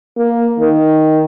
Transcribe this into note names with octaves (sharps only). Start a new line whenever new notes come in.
A#3
D#3